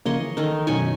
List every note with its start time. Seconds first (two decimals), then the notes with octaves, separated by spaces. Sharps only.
0.06 C#3 F3 A#3 C#5 D#5 C6
0.21 E3
0.37 D#3 D#4 A4 A#4
0.67 F#2 B2 C#4 D#4 C#5 G#5